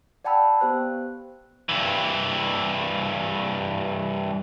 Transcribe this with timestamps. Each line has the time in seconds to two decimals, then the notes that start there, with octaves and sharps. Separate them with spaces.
0.25 D5 F#5 G5 A5 B5 E6
0.61 B3 G4 C5 F#6
1.69 G2 E3